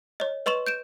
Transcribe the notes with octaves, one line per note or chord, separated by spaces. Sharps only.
C#5 D#5
B4 D#5 C6 C#6 E7
G6 D7 E7